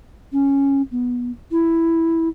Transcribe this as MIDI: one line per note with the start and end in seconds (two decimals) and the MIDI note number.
0.33 0.82 61
0.92 1.31 59
1.52 2.28 64